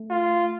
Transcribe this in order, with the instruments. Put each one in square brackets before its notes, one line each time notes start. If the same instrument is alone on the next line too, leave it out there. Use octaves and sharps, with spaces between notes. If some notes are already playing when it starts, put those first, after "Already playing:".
Already playing: [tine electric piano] A3
[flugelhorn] F4